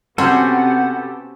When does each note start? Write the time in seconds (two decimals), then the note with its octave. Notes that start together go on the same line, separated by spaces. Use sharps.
0.18 C3 B3 C#4 F#4 G4 A4 C5 F#5